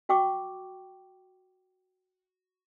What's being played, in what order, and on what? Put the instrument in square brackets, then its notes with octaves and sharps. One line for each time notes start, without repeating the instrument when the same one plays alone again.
[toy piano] F#4 G5 C#6 D6